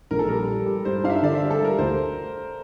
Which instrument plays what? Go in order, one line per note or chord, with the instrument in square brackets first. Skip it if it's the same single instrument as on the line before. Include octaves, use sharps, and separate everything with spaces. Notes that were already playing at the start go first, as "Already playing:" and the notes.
[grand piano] A#1 [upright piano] A#4
[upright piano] A4
[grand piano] G3 [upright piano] A#4
[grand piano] G3
G3
[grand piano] G2 [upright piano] C5
[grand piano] D4 [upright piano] F5
[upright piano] E5
[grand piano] D3 [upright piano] D5
[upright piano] E5
[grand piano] G3
[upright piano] A4
[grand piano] G3 [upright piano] A#4
[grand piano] D2 [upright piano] C5